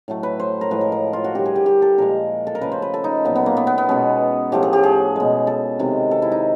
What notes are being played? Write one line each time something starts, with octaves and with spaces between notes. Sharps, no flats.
A2 F#3 A3
B4
C5
A#4
A2 F3 G#3 B4
A#4
A#4
F4
F#4
D3 G3 G4
G#4
G4
G4
A4
A#2 F3 G#3 A#4
A4
A#4
C#3 F3 A3 B4
C5
B4
A4
D#4
A#2 F#3 A3 B3
B3
A#3
B3
B3
B3
B2 G#3 C#4
A2 F3 A3 G4
G#4
G4
G#4
B2 G#3
A4
C3 D#3 G#3
A4
E4
D#4